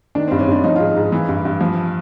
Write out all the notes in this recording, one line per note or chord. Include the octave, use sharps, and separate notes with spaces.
D#3 D4
G2 C4
C#4
G2 D4
F3 D#4
G#2 F4
G#2
E3
G2
G2
F3